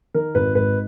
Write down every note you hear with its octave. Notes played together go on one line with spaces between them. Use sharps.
D#3 A#4
G#1 B4
G#2 B4